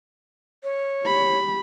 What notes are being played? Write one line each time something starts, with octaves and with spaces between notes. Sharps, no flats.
C#5
G4 B5